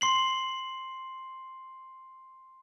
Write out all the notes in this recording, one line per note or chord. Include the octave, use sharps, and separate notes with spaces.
C6 C7 F#7